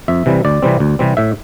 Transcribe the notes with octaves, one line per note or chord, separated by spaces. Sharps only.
F2 E5
C3 E3 G3
D2 D5
C3 E3 G3 C4
D2
C3 E3 G3 C4
A2 E5